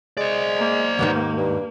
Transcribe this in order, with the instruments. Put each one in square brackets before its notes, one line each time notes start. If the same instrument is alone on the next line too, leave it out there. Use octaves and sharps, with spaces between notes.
[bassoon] G#3 [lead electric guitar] C5 D5
[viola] A#3
[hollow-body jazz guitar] D#2 G#2 D#3 [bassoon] B3
[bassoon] G2